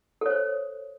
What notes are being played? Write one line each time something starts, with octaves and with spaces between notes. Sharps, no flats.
A4 C5 C#5